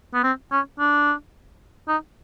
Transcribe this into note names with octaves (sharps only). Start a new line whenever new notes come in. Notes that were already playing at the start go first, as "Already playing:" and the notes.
B3
C4
C#4
D4
D#4